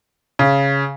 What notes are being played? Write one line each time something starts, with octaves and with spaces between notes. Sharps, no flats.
C#3